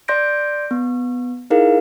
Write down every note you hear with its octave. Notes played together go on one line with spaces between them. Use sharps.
D5 C6 G6 A#6 D7
B3
D#4 E4 G#4 A#4 F5